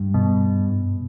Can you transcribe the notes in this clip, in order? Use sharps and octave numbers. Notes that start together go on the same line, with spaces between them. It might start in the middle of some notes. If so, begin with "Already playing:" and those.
Already playing: G2
B2